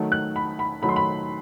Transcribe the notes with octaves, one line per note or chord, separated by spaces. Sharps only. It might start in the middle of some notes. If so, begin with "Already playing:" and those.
Already playing: D#3 F#3 A3
F#6
B5
B5
D#3 F#3 A3 B5
C6
B5